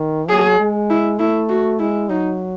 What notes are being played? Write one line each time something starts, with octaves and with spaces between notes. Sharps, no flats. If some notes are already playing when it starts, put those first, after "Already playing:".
Already playing: D#3
F#3 G#4
G#3
E4
A3 E4
F#4
G#3 E4
F#3 D#4